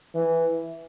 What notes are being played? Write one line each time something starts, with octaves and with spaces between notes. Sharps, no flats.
E3